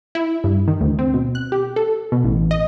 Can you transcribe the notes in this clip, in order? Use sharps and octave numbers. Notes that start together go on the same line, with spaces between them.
E4
G2
D#3
D2
C4
B2
F#6
G4
A4
B2
A1
D#5